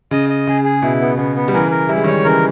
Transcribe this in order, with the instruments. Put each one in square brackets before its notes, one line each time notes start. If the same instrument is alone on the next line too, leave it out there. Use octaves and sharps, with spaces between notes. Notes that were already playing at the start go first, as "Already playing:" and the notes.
[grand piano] C#3 [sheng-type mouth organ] D#5
[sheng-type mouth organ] D#5
[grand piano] C#3 [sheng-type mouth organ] G#4
[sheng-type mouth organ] G#4
[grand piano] B2 [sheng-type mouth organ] E4
[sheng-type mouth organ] B3
[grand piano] C#3 [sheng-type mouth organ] B3
[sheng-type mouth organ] B3
[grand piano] G3
[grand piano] C#3 E3 [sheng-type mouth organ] A#4
[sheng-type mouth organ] A#4
[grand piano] G3 [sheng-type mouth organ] E4
[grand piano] G#3
[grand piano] D#3 G3 [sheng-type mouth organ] C#5
[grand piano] C#3 E3 [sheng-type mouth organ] A#4